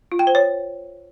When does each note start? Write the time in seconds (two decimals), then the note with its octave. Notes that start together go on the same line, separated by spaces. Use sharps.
0.12 F4
0.19 G5
0.27 C5
0.35 C#5